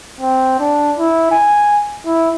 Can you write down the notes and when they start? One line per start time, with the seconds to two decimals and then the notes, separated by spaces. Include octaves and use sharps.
0.21 C4
0.60 D4
0.98 E4
1.32 G#5
2.06 E4